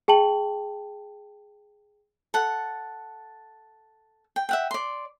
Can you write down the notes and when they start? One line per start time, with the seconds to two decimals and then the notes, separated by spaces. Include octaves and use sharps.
0.08 G#4 G5 A5 F#7
2.34 A4 F#5
4.36 G5
4.49 E5 F#5 G5
4.71 D5 C6